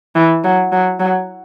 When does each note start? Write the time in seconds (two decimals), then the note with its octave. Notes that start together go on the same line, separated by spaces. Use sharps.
0.15 E3
0.44 F#3
0.72 F#3
1.00 F#3